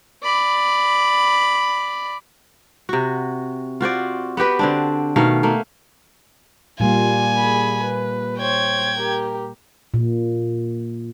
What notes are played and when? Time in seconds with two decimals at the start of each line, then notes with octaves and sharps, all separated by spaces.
0.23 D5 B5
2.89 C3 F#4
3.81 F4 F#4 C5 D5
4.37 B3 F#4 G4 B4
4.59 D3 C4 D4
5.16 B2 D#3 A3 F5
5.43 A3 A#3
6.80 A#2 G3 A#3 F4 G#5
7.38 G#4 B5
7.83 B4
8.38 C5 C#5 G5 G#6
8.97 G4 A#4
9.94 A#2